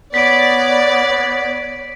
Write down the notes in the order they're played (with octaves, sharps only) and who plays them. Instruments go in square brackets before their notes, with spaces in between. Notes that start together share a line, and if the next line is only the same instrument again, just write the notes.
[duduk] B3 [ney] C#5 [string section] D5 [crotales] B6 D7